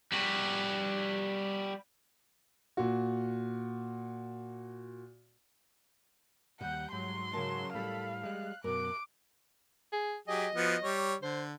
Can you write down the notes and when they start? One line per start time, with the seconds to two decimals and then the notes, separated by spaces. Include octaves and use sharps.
0.12 G3 F#4
2.77 A#2 F#4
6.61 D#2 G#2 G3 F#5 G6
6.92 G#2 F#3 C6
7.33 C#3 F#3 A#4 A5 E7
7.74 A2 G3 A4 F5 B5
8.23 G3 G#3 F#6
8.64 F#2 B2 A#4 D6
9.92 G#4
10.28 F#3 G4 G#4 D#5
10.55 F3 B3 F#4
10.82 G3 C#5
11.22 D3 C5